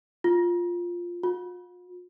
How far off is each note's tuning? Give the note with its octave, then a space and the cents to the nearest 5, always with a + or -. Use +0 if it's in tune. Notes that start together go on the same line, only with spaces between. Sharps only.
F4 +0
F4 +40